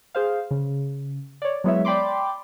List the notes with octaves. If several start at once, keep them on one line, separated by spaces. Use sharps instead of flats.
G#4 C5 F5
C#3
C#5 D5
F#3 G#3 B3 E4 C#5 E5
D5 G5 B5 C6 D6